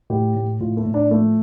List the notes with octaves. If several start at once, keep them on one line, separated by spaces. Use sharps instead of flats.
A2 G4
A2
A2 F4
A3
A2
D4
F3 A3